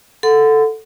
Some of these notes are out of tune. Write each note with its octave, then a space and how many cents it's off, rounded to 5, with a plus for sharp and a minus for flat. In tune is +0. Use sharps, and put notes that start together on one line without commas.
A4 +0 F#5 -15 C6 -40